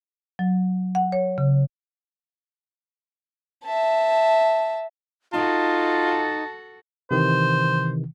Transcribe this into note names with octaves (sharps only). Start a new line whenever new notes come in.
F#3
F#5
C#5
C#3
E5 A5
D#4 F4 F#4 A4 A5
C3 D#3 E3 C5